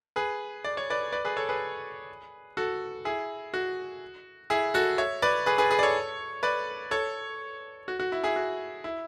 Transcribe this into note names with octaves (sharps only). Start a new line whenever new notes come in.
G#4 B4
D5
C#5
B4 D5
B4 D5
G#4 B4
A4 C#5
G#4 B4
F#4 A4
E4 G#4
F#4
E4 G#4
F#4 A4
C#5 E5
B4 D5
G#4 B4
G#4 B4
G#4 B4
D5
A4 C#5
B4 D5
A4 C#5
F#4
F#4
E4
E4 G#4
F#4
E4